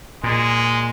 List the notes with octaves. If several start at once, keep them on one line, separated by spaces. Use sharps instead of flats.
A#2 G#3